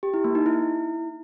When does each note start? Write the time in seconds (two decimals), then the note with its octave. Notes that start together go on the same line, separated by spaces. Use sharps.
0.03 G4
0.14 E4
0.24 A#3
0.35 D#4
0.46 E4